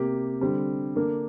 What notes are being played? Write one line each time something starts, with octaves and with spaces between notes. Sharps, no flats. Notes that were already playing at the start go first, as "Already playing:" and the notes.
Already playing: C3 A#3 G4
D3 G3 C4
D3 A#3 D4 A#4